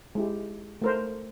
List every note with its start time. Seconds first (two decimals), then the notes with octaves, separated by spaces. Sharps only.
0.15 G#3 E4 G4
0.82 A3 A#4 C5